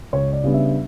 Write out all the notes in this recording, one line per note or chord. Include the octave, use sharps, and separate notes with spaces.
C#2 C#5
D5
C#3 G3 B3 D4
E5